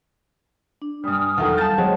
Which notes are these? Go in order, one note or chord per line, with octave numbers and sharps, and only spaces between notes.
D4
G2 G3 G#5 D#6 F6
E2 D#3 F#3 A4 F#5
G3 F5 A5 G6 A6
F#3 G#3 C4 C#5 F#5